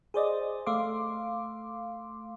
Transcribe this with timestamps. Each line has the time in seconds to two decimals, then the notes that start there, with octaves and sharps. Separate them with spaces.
0.14 G#4 C5 D5 D#5
0.66 A3 F5 C6 D6